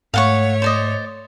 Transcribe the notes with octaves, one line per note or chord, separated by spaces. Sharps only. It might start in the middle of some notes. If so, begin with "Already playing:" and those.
G#2 A3 C#5 F5 F#5 C#6
C5 D5 D#5